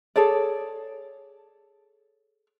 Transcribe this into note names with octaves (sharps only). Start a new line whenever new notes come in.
G#4 A4 C#5 D5